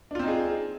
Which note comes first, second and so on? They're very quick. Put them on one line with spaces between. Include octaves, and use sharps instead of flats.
D4 F4 C4 D#4 G#4